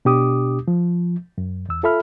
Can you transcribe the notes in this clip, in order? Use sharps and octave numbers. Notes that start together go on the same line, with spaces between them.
B2 D4 G4 D6 D#6
F3
F#2
E2 E6
F4 A4 E5 B5 F6